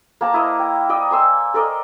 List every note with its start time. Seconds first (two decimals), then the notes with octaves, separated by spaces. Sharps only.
0.21 A#3 A5 A#5
0.34 E4 D#5
0.59 G5
0.89 D5 D#5 G5
1.11 G#5 C6 E6
1.54 A4 A#4 D5 D#5